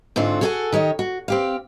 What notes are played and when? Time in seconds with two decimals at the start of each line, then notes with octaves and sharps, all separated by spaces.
0.16 G#2 D3 C4 F4 F#4
0.41 F#4 G#4 A4 C#5 F#5 G#5
0.72 D#3 G4 C#5 D#5
0.99 F#4
1.28 C4 G4 F5